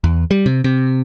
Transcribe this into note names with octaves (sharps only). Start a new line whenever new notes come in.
E2
G3
C3
C3